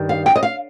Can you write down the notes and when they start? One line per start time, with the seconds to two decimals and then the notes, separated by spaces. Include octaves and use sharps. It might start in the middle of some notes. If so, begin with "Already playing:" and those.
Already playing: G2 D#3 G3
0.09 F5
0.26 G5
0.36 D#5
0.43 F5